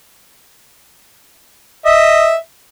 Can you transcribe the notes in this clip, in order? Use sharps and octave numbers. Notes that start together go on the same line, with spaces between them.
D#5 E5